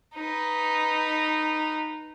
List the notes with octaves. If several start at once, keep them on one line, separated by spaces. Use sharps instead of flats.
D#4 B4